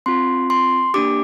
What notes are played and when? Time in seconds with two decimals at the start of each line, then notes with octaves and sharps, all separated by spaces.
0.06 C4 F4 C6
0.50 C6
0.94 A#3 D4 G4 D6